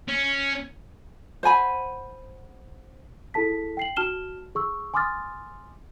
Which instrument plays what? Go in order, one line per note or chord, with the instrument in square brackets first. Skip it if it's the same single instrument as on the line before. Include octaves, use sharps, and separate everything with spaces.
[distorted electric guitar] C#4
[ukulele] C5 F#5 G#5 B5
[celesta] E4 G#4 A4 A5 B6
G5 C7 F#7
F#4 A5 F6 E7 G7
G#4 C#6 E6
G#5 C6 D6 D#6 F6 A6